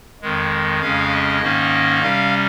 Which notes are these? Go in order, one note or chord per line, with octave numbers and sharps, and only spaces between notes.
F2 D#3 G#3
F2 C#3 G#3 C#4 F5
D#5
G#2 D#3 A#3 C#4
C3 G3 C#4 F5